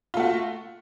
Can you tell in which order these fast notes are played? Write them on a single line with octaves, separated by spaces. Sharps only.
F4 A3 F#4